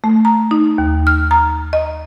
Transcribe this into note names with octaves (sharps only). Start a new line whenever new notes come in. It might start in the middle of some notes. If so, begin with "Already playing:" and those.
A3
A#5
D#4
D#2
F6
A#5
D#5